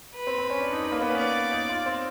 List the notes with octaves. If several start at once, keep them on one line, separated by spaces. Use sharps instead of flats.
B4
C4
C4
C#4
D4
D#4
D#4 B4
A#3
B3
C#4
D5
D#4
F4
C4